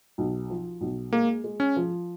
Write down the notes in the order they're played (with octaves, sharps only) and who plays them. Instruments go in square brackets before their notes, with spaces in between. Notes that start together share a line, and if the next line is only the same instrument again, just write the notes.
[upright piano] B1
F3
B1
[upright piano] G#3 [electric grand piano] A#3
[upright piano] G#3
[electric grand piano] C#4
[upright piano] F3